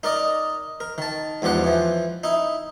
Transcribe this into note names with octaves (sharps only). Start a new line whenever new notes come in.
D#4 A#4 D5 D#5
A#4
D#3 A5
E2 G#2 F3 G4 F#5
E3 F3
D#4 E4